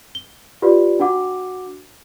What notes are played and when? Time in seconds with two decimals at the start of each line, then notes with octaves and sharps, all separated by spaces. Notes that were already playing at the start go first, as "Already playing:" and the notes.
0.15 G7
0.62 F4 G4 B4 D5
0.99 D4 F#4 F#5 D6